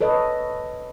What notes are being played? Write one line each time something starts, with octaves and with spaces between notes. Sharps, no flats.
A4 B4 C#5 D#5